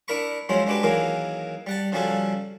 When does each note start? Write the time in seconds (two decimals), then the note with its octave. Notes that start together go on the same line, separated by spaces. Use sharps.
0.08 D4 E4 A#4 A#5 B5 C#6
0.49 F3 F#3 G#3 C#4 E4 C5
0.67 G#3 D4 F#4 G4 B4
0.83 D#3 E3 F#3 A#3 G#4 A#4
1.67 G3 F#5 A5
1.92 C#3 F3 G3 F#4 G#4 A4